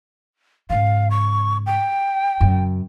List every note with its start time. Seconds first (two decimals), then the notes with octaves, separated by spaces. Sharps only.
0.70 G#2 C#3 F5
1.11 C#6
1.66 G5
2.41 F#2 C#3